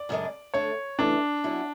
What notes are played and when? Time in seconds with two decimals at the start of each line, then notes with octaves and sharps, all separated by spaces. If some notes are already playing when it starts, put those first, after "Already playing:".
Already playing: D5
0.09 F#2 C#3 G#3 D4
0.54 D3 A3 D4 C#5
0.99 E2 C#3 E3 A3 D4 E4
1.44 B2 F#3 C#4 E4